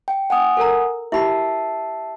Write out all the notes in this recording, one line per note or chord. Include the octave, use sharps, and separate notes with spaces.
G5
F#5 G#5 D#6
A4 A#4 A#5
E4 G4 E5 A5 B5 C7